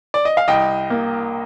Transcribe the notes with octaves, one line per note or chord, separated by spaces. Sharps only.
D5
D#5
F5
C2 D#5 G5
A#3